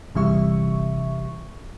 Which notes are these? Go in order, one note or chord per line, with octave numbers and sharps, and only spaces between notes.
G1 C3 E3 G3 E5 C#6